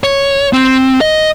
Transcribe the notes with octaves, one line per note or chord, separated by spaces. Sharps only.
C#5
C4
D#5